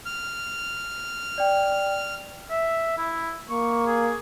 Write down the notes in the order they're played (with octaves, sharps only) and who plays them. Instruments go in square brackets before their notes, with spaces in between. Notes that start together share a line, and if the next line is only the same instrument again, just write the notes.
[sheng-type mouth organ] F6
[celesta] D5 G5
[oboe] E5
E4
[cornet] A#3 [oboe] C#6
[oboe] G#4